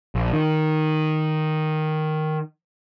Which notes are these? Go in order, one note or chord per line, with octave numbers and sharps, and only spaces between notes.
A#1
D#3